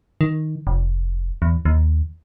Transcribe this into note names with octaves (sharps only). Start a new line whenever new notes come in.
D#3
F1
E2
D#2